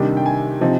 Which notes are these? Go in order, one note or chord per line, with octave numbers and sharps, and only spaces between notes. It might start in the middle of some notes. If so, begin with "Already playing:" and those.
Already playing: C3 D#3 G3 D4
G5
G#5
C3 F3 C4 D#4